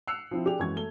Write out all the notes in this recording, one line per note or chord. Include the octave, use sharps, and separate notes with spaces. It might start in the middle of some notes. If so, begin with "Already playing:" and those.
E6 F#6 C7 C#7 F7
F3 C4 E4
D4 G4 G#4 F7
F#2 E3 G#3 C#6 G#6
A3 G7